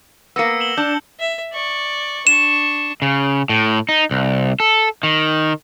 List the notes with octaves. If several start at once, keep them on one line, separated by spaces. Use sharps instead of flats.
A#3 B3 E6 A#6 C#7
E7 F#7 G7
D4 G6
E5
D5 C#6
D4 C#6 E7
C#3
A2
D#4
C2
A4
D#3